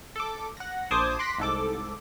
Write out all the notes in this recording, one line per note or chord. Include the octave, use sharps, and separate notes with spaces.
A4 D6
F#5 A#6
A#1 C5 A5 D6 D#6 G#6
C6 D6 F#6 A#6 B6
C2 G#2 A4 D6